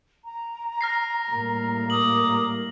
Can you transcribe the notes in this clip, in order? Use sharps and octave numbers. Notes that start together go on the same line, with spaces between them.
A#5
F6 A#6 C7
A2 G3 A#3
A#5 D6 D#6 F#7